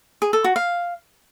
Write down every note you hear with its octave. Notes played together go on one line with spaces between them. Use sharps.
G#4
A4
F#4
F5